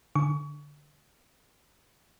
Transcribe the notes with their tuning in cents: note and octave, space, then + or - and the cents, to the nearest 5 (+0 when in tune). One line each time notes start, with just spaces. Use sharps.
D3 +0 C#6 +25